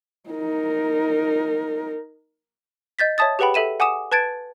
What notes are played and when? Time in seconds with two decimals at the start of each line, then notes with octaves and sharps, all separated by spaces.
0.30 D#4 A#4
2.99 D#5 G6 A6 B6
3.18 C#5 E5 A5 D#6 A6
3.39 G4 G#4 B4 F#5 G5 B5
3.54 A4 E5 D#7 E7
3.80 F#5 G#5 D6 D#6 E7
4.12 B4 A5 G#6 A6 D7